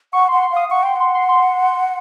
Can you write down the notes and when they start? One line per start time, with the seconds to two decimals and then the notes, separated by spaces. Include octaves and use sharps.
0.13 F#5 C#6
0.28 F#5 C6
0.42 C6
0.51 F5
0.56 D#6
0.71 F#5 C#6
0.83 G5 C6
0.96 F#5 C6
1.15 C6
1.29 C6